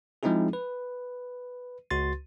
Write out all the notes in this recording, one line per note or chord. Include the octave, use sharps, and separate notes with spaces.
F3 G#3 C4 D#4 E4 G#4
B4
C#2 F#4 C6 A6